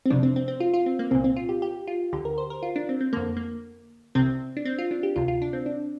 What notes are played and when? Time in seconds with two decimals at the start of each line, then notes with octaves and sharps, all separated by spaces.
0.06 C4
0.10 F2 C3 D4
0.23 C4
0.36 C4
0.48 C4
0.60 F4
0.74 F4
0.86 C4
0.99 A#3
1.11 C2 A#2 C4
1.24 C4
1.36 F4
1.49 G4
1.62 G4
1.87 F4
2.13 D2 D3 G4
2.25 A#4
2.38 C5
2.50 A#4
2.63 F4
2.76 D4
2.89 C4
3.01 C4
3.13 F2 D3 A#3
3.37 A#3
4.15 C2 C3 C4
4.57 D4
4.65 C4
4.78 F4
4.91 D4
5.03 G4
5.16 D2 C3 F4
5.28 F4
5.42 D4
5.53 C4
5.66 D4